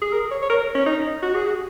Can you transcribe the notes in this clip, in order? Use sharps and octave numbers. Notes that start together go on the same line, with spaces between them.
G#4
A#4
C#5
C#5
A#4
C#4
D#4
F#4
G#4
F#4